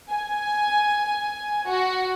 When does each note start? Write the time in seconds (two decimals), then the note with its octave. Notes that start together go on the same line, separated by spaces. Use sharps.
0.10 G#5
1.67 F#4